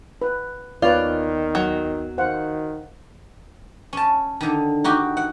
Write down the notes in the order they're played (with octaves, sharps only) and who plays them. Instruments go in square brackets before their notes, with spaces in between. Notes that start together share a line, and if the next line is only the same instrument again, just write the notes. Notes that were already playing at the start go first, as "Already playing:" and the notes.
[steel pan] B4
[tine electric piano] D#2 B3 [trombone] D#3 [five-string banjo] F4 [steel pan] B4 C#5 D5
[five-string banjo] F#3
[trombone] D#3 [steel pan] C5 F5 F#5
[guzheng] C#4 A5
D3 D#3
D#4 F#4 G4
F#5